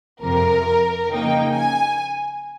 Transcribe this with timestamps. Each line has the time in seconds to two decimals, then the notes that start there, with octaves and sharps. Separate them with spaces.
0.22 F2 C3 F3 A#4
1.10 C#3 F3 A#3 D#4 G5
1.55 G#5